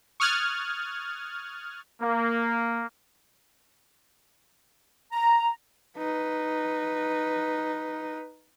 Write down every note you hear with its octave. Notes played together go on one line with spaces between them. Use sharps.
C#6 D#6 F6 F#6 G#6 A6
A#3
A#5
D#4 B4